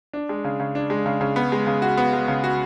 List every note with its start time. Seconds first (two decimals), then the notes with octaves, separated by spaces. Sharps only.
0.13 D4
0.29 G#3
0.44 C#3
0.60 C#3
0.75 D4
0.90 G#3
1.06 C#3
1.21 C#3
1.36 B3
1.52 G#3
1.67 C#3
1.82 F#4
1.97 B3
2.13 G#3
2.28 C#3
2.44 F#4